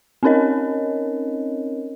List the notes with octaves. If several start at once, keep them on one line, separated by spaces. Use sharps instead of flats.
C4 C#4 D#4 A#4 C#5 D#5